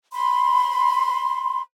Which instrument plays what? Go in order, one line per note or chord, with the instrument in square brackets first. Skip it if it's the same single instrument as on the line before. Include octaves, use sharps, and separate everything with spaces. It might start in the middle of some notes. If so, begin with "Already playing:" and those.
[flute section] B5 C6